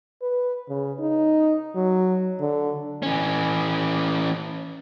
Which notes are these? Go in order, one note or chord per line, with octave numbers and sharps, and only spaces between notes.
B4
C#3
D#4
F#3
D3
E3 C#4